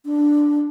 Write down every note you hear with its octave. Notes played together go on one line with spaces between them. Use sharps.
D4